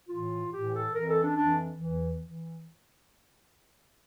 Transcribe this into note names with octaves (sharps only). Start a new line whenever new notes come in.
A2 E3 F4
A2 E3 G4
A4
F2 E3 A#4
A4
D4
F2 E3 D4
E2 E3
E3